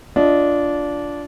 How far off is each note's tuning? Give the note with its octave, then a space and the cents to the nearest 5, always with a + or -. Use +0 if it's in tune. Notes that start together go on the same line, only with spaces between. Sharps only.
D4 -15 F4 +0 D#5 +5